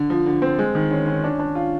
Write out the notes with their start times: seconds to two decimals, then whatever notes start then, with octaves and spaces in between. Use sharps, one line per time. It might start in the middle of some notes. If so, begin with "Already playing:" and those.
Already playing: D3
0.10 F3
0.26 D3
0.42 C4
0.59 G#3
0.75 D#3
0.91 C#4
1.07 C#4
1.24 D4
1.39 D4
1.55 F4